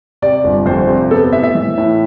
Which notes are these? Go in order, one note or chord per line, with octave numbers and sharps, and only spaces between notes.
C3 D5
G1
F2 C5
C3
B3 A4
A2 E5
E5
E3
A2